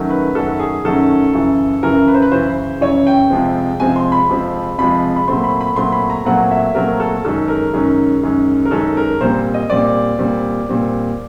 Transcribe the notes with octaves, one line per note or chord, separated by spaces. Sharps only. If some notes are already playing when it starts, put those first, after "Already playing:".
Already playing: D#3 F#3 A3 C#4
B4
F#2 D#3 F#3 A3 C#4 A4
G#4
F#2 D#3 F#3 A3 C#4 A4
F#2 C#3 E3
F#2 C#3 E3 A#4
B4
C5
B4
F#2 C#3 E3 C5
F#2 C#3 E3 C#5
G5
F2 C3 F3 G#3 C4
F2 C3 F3 G#3 C4 G#5
C6
B5
F2 C3 F3 G#3 C4
F2 C3 F3 G#3 C4 B5
B5
A#2 F#3 A3 C4 C6
B5
B5
A#2 F#3 A3 C4 C6
B5
A#5
A#2 F#3 A3 C4 F#5
E5
A#2 F#3 A3 C4 A#4
A4
F#2 D#3 G#3 C#4 A4
A#4
F#2 D#3 G#3 C#4
F#2 D#3 G#3 C#4
A#4
F#2 D#3 G#3 C#4 A4
A#4
A#2 G3 C4 C5
D#5
A#2 G3 C4 D5
A#2 G3 C4
A#2 G3 C4